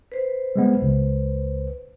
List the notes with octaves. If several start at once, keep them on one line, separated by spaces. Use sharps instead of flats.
B4 C5
G3 G#3 B3
C#2